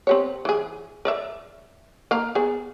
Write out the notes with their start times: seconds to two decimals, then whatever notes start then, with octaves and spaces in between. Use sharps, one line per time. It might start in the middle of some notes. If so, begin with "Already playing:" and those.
0.07 C4 G4 C#5
0.45 E3 G#4
1.05 A#4 D5 E5
2.11 A#3 F5 A#5
2.35 B3 G#4